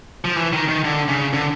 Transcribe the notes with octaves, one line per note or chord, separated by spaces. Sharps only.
F3
E3
D#3
D#3
D3
C#3
D3